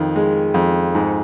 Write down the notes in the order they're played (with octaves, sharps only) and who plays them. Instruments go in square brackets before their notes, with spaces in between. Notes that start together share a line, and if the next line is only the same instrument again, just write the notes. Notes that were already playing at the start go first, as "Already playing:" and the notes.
Already playing: [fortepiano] F2 D#3
G#3
F2
G#2